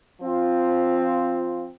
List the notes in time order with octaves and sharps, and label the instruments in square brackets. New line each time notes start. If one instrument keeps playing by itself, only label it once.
[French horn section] F3 C4 F4